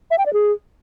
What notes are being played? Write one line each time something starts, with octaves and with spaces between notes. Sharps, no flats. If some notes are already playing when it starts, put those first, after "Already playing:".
E5
G5
D5
G#4